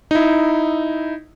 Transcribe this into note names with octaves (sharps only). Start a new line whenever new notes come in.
D#4 E4